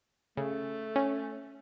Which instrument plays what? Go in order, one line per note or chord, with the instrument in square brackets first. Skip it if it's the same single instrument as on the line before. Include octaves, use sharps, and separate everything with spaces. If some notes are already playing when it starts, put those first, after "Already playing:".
[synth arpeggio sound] C#3 [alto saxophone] A3
[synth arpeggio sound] C#4